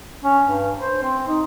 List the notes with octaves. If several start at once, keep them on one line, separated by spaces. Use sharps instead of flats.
C#4
G2
C5
C4
D#4